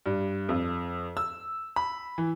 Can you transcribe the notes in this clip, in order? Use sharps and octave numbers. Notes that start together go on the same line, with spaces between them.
G2
F2
E6
B5
E3